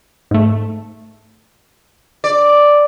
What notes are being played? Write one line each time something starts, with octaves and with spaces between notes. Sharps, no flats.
G#2 A3
D5